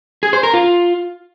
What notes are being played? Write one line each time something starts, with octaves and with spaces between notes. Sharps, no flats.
G#4
C5
A#4
F4